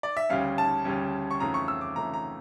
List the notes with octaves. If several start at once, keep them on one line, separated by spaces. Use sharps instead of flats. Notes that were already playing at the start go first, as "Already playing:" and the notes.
D5
E5
D2 C#3 G3 C#4 F5
A5
D2 C#3 G3 C#4
C#6
F2 C#3 E3 A3 A#5
C#6
E6
D6
F2 C#3 E3 A3 A#5
A#5